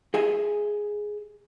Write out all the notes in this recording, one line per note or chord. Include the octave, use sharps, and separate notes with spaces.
G#4 D#5 E5 G#5